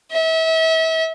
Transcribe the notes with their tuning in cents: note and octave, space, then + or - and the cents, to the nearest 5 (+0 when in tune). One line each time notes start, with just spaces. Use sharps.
E5 -35